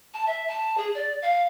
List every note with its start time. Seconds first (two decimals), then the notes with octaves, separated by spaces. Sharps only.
0.14 A5
0.27 E5
0.48 A5
0.77 G#4
0.95 D5
1.22 F5